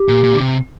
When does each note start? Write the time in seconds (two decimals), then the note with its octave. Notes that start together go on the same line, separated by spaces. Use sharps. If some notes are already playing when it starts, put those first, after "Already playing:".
Already playing: G4
0.08 A#2
0.24 A#2
0.34 D3
0.40 C3